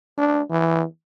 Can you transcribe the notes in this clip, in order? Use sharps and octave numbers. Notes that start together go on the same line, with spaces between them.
D4
E3